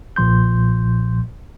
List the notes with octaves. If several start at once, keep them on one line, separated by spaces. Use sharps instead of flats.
B1 A#2 F3 C6 G6